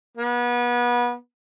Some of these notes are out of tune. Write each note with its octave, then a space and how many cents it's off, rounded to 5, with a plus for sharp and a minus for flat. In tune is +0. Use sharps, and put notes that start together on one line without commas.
B3 -30